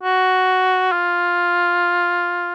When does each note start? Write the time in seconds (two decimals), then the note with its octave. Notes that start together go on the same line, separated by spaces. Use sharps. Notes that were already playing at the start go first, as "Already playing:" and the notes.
0.03 F#4
0.92 F4